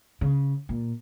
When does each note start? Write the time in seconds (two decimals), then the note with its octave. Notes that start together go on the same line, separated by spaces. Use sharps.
0.21 C#3
0.69 A#2